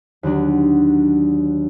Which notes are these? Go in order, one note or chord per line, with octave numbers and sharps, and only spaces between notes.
D#2 D3 F#3 D4